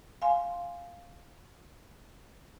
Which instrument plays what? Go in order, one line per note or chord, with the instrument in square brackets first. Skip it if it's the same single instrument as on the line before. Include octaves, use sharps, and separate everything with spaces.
[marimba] F5 G#5 C6